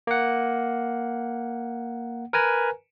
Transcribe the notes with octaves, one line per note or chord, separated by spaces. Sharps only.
A#3 F#5
A#4 B4 G#5 A#5